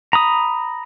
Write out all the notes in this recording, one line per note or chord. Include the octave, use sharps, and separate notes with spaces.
A#5 B5 D#6